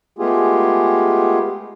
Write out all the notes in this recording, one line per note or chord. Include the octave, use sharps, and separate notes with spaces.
G#3 A3 B3 F4 G4 G#4